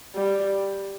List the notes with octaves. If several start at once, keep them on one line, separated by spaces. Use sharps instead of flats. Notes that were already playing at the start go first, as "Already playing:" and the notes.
G3